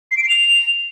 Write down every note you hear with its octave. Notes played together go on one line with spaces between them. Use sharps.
C7
D7
C7
F7